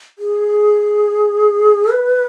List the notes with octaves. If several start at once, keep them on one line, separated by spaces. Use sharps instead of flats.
G#4
B4